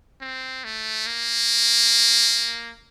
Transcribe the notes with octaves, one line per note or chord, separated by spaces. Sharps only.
C4
A3
A#3